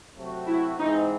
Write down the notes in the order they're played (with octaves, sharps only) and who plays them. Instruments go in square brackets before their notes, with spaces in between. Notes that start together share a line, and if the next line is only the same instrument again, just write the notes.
[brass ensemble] C3 F#3 A3 C4 F#4
[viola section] E4
[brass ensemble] G#2 E3 C4 [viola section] D#4